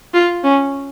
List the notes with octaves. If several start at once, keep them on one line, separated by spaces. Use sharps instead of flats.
F4
C#4